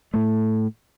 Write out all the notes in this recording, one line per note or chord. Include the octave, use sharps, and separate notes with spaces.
A2 A3